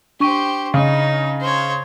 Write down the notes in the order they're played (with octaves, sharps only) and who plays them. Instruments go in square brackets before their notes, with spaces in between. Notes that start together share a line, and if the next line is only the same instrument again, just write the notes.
[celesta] D4 C#6 D#7 [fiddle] G4 C5
[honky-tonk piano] C#3 [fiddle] D#4
[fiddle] C5 C#5